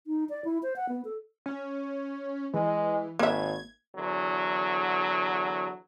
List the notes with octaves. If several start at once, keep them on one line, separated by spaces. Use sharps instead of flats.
D#4
D5
E4
C5
F#5
B3
A4
C#4
E3 G#3
G#1 A#3 E5 G#6
E2 D3 F#3